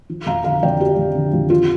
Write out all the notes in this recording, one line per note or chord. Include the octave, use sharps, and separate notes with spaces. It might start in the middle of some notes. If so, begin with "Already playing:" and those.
F3
F2 F5 A#5
D3 F5 A#5
F2 D5 G5
F3 G4
F2
D3
F2
F3 F4